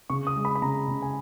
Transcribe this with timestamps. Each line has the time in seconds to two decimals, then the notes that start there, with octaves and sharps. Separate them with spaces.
0.10 C#3 C#6
0.27 D#6
0.36 G#3
0.45 B5
0.55 B5
0.62 C#3 A#5
0.88 C#3
1.02 G#5